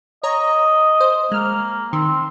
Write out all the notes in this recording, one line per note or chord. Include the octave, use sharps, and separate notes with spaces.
C#5 D#5 A#5
C5
G#3 A#3 F6
D#3 C4